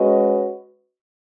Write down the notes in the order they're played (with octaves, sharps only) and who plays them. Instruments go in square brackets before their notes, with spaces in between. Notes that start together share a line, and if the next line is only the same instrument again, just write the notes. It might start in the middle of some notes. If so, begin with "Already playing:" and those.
Already playing: [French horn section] G#3 C#4 F#4 B4 D#5